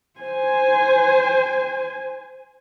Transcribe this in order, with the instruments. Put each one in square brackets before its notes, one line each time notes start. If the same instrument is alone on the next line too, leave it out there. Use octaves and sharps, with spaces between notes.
[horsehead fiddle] C5 G#5